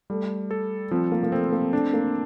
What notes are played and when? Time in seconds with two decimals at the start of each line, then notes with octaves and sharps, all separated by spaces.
0.10 G3 A3
0.51 A4
0.91 F3 C4
1.12 A#3
1.23 A#3
1.32 A3 C4
1.52 A#3
1.73 A3 D4
1.93 A#3